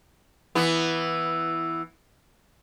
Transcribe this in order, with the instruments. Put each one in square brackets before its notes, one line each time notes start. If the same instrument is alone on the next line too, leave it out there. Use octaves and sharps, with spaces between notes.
[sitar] E3 B3